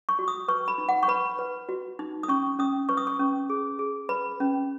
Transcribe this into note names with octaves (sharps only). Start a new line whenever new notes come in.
C#6
F#4
D#6
B4 C#6
B5
D#4
F#5
C#6
B4 B5
B4
F#4
D#4
D#6
C#4 C#6
C#4 D#6
B4 C#6
D#6
C#6
C#4
G#4
G#4
B4 B5
C#4